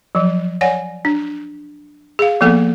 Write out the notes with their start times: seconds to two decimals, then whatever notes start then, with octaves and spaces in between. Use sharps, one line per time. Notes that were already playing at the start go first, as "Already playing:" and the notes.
0.15 F3 F#3
0.61 C#5 D5 F#5 G#5
1.05 D4
2.19 G#4 F5
2.41 F3 A#3 B3 A4